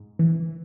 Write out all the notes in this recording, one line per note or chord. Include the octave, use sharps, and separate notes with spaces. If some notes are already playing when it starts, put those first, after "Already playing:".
Already playing: G#2
E3